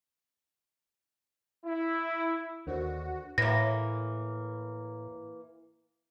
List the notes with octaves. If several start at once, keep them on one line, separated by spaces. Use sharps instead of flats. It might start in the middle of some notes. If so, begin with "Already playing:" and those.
E4
D#2 D3 D4 F#4 A#4 C5 C#5
A2 E3 A#3 A#6